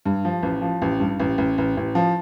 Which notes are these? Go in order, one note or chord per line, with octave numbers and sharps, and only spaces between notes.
G2
F3
A1
F3
A1
G2
A1
A1
A1
A1
F3